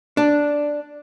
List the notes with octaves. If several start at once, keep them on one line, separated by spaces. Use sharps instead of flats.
D4